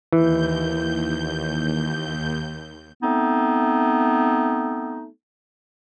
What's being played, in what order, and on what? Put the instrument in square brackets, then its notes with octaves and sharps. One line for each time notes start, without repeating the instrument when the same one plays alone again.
[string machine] D#2 G6 [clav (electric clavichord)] E3
[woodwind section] A3 B3 C4 D#4